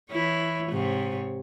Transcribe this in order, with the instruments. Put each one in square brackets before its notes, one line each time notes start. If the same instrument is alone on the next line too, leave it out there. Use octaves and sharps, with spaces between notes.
[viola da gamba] E3 E4 C#5
G#2 C3 C#5